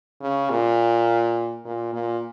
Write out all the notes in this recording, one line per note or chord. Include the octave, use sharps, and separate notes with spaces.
C#3
A#2
A#2
A#2